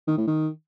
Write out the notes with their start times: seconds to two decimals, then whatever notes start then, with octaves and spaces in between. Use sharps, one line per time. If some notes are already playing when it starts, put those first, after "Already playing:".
0.08 D#3
0.18 A2
0.28 D#3